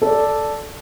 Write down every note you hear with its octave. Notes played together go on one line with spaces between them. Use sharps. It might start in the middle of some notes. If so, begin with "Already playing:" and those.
A4 D5